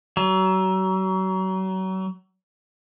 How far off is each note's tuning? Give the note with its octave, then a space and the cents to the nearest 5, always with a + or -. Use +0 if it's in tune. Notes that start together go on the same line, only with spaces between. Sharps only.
F#3 +35